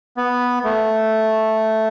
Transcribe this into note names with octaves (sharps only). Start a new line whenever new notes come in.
B3
A3